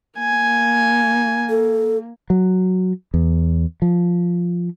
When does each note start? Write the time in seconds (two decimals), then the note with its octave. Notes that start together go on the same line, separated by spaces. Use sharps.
0.19 A#3 G#5
1.49 A4
2.30 F#3
3.14 E2
3.82 F3